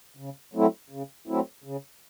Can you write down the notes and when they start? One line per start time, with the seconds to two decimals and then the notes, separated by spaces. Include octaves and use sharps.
0.17 C#3
0.54 F#3 A3 C4 E4
0.90 C#3
1.27 F#3 A3 C4 E4
1.64 C#3